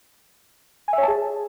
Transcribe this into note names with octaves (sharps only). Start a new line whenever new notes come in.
G#5
E5
C#5
A5
G#4